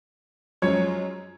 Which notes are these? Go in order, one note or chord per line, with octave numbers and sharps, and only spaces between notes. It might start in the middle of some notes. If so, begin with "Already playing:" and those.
F#2 F3 G#3 C#4 C#5